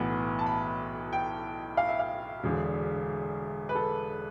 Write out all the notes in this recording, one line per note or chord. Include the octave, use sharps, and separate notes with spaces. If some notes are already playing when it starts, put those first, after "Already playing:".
Already playing: B1 A2 E3 B3
A5
B5
G5
F5
E5
F5
E1 E2 D3
B4
A4